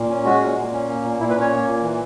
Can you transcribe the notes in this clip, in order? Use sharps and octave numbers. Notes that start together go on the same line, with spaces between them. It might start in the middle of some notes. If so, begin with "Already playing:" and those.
Already playing: A#2
C#4
G#3 F#4
A#2
A#2
C#4
A#3
A#2
A#2 E4
B4
C#4
C#5
A#3
A#2
E3